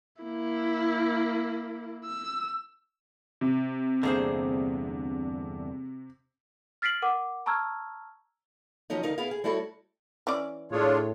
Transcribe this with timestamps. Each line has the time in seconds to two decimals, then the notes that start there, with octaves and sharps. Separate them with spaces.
0.23 A#3 E4
2.05 E6
3.41 C3
4.03 E2 G2 D3 A#3 G#4 C5
6.82 F6 A6 B6 C7 D7 F#7
7.02 A#4 F#5 D6
7.46 A5 A#5 C#6 E6 F6 G#6
8.90 D#3 F3 F#3 C#4 D#4
9.03 D2 D#4 A#4 F5
9.18 B3 E4 G#4 F5
9.31 G#4
9.44 G3 A3 E4 F#4 A4 C#5
10.27 E3 C#4 D5
10.72 A2 D4 F4 G#4 C#5